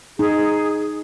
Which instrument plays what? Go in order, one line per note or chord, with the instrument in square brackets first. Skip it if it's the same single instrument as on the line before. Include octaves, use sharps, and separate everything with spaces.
[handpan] D#4 [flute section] G#4